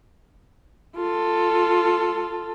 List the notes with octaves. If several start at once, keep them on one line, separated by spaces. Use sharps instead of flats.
F4 A4